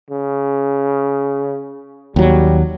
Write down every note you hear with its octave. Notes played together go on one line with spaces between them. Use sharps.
C#3
D#2 F#3 G3